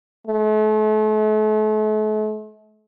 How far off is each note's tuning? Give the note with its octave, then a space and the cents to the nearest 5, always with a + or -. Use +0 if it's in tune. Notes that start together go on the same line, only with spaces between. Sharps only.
A3 -40